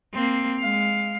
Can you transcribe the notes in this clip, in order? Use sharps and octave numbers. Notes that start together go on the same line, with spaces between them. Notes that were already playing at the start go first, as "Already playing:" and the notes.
A#3 C4
G#3 F5